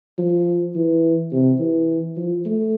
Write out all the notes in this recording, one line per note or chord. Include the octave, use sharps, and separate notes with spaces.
F3
E3
C3
E3
F3
A3